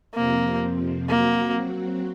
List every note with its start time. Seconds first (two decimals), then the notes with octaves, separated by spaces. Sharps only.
0.15 F2 C3 F3 A#3 C4
1.09 F#3 A#3 C4 F#4